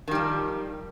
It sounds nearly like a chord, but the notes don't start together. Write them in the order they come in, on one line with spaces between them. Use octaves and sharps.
D#3 G3 F3